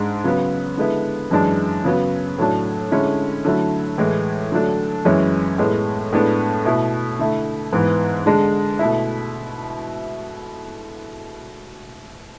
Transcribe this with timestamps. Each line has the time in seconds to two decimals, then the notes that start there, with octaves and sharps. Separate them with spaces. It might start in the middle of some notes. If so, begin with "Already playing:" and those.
Already playing: G#2 G#3 D4
0.24 C#3 F#3 B3
0.78 D3 G#3 B3 E4
1.31 F#2 E3 G#3 D4
1.84 C#3 F#3 B3
2.38 A2 F#3 A3 D4
2.92 D3 G#3 C#4 E4
3.45 D3 F#3 A3 E4
3.98 A2 E3 G#3
4.52 D3 F#3 A3 D4
5.05 F#2 E3 G#3 C#4 E4
5.58 A2 G#3 B3
6.13 A2 G#3 B3 D4
6.65 B2 A3 E4
7.19 D3 A3 E4
7.73 G#2 E3 B3
8.26 D3 G#3 D4
8.79 B2 A3 E4